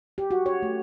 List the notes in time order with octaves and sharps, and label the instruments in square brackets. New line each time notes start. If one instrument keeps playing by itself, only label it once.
[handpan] G4
F#4
C#5
A3